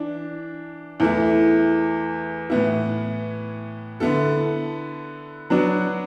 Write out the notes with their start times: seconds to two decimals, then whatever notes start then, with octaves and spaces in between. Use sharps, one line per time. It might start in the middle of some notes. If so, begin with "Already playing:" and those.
Already playing: E3 D4
1.00 E2 E3 A3 E4
2.50 A2 E3 B3 E4
4.00 D3 B3 E4 A4
5.50 F#3 B3 D4 F#4